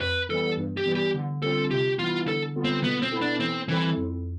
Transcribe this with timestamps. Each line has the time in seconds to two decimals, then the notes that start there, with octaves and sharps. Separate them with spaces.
0.01 F2 B4
0.29 E3 G3 B3 A4
0.57 G2
0.77 G4
0.86 E3 G3 B3
0.95 G4
1.14 D3
1.42 G3 C4 F4 A4
1.71 C3 G4
1.99 E3 G3 B3 E4 F4
2.27 D3 A4
2.56 G3 B3 F4 A4
2.64 C4
2.84 B2 B3
3.02 C4
3.12 B3 E4 A4
3.22 D4
3.40 E3 C4
3.68 E3 G3 C4 E4 A4
3.97 F2